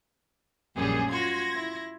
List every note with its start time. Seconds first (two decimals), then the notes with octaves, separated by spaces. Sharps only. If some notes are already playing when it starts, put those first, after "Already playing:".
0.76 A#1 F#2 G3 G#4
1.10 F4 F#4 C6 G#6 A#6
1.54 E4